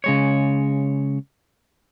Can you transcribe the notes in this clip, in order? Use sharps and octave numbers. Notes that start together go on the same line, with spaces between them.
C#3 G#3 C#5